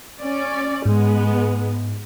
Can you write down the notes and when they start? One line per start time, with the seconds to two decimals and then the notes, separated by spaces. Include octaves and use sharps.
0.20 C#4 D5
0.86 G#2 G#3 B3